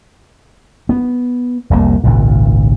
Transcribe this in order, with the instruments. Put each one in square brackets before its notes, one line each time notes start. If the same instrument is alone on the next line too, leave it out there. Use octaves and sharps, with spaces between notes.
[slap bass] B3
F1 C2 G#2 A#3
G#1 C#2 A#2